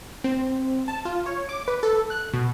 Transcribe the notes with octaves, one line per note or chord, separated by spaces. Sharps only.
C4
A5
F4
C#5
D6
B4
A4
F#6
B2